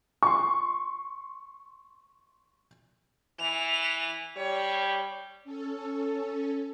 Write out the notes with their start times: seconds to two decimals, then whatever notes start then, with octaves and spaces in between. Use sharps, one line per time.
0.23 C6 C#6
3.40 E3 F7
4.37 G3 C#5
5.44 C#4 A4